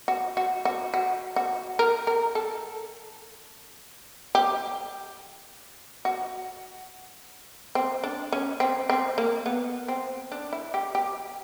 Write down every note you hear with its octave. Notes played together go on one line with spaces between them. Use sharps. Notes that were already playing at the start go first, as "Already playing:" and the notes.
F#4
F#4
F#4
F#4
F#4
A#4
A#4
A4
G4
F#4
C4
D4
C#4
C4
C4
A#3
B3
C4
D4
E4
G4
G4